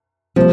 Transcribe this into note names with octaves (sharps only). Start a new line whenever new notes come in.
C3 F3 G3 A#3